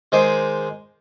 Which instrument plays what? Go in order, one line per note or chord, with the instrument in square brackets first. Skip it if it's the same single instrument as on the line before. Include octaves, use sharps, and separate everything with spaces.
[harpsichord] D#3 G#3 C5 G5 G#5 D6